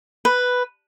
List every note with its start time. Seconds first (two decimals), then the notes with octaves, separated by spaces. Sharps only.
0.25 B4